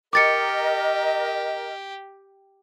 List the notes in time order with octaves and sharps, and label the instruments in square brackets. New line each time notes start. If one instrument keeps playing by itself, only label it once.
[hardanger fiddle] G4 [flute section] A#4 D#5 [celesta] D6 A6 C#7